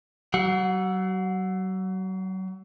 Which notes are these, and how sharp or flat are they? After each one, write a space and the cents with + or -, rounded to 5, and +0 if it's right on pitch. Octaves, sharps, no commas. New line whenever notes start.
F#3 +35 F#5 -20